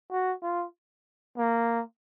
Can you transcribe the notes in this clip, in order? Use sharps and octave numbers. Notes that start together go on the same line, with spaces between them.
F#4
F4
A#3